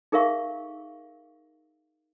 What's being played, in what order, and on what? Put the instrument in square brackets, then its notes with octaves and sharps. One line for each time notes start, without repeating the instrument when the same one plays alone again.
[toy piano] D#4 G#4 A#4 E5 F5 C#6